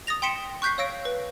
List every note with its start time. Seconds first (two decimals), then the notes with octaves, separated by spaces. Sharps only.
0.07 D#6 A6 A#6 F7
0.22 G5 C6 B6 C#7 D7 E7
0.62 C#6 F#6 G6 B6 C7
0.78 C#5 F5 E6 A#6 D7
1.05 B4